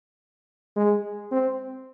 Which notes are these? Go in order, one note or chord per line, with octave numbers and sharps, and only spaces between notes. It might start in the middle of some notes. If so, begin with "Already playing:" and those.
G#3
C4